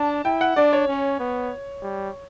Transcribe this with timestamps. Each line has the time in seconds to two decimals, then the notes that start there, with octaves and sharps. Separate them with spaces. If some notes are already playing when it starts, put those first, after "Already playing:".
Already playing: D4 A5
0.25 E4 G5
0.41 F#5
0.56 D4 D5
0.73 C#5
0.88 C#4
1.19 B3
1.83 G3